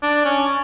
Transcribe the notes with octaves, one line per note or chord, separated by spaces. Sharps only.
D4
C#4